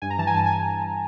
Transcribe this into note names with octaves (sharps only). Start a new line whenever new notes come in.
G2 G#5
A#5
E3 A5
G#5
G2 A5
G#5